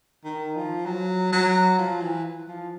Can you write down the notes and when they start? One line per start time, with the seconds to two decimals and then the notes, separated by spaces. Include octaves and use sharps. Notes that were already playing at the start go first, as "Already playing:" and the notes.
0.24 D#3
0.56 F3
0.86 F#3
1.32 F#3
1.79 F3
2.02 E3
2.48 F3